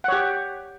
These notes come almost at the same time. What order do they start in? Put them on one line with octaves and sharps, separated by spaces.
F#5 C#5 G4